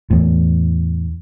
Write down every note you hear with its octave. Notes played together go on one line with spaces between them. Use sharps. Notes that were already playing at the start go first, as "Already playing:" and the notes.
E2 A2